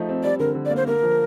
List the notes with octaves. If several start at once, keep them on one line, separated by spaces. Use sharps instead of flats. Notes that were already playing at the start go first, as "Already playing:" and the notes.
Already playing: F3 A3 D#4
C4
G3 D5
D3 A#4
D3
D5
A#3
C5
A#3 A#4
F3